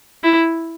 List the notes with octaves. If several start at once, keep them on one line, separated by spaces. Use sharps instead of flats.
E4